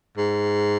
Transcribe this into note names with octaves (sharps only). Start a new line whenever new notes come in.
G#2